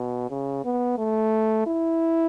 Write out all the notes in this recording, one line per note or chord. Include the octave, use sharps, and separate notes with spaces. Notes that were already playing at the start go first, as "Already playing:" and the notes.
Already playing: B2
C#3
B3
A3
E4